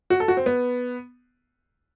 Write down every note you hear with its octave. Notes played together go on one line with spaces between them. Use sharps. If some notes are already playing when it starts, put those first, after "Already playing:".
F#4
A4
F#4
C4
B3